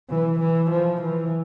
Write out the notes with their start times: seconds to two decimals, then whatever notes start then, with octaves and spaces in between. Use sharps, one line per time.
0.10 E3
0.40 E3
0.71 F3
1.02 E3